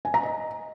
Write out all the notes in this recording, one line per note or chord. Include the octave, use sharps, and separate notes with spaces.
G#5
A#5
D#5